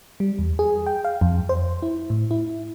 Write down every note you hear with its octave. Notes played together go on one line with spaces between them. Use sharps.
G3
E2
G#4
G5
F5
F2
C5
E4
A2
E4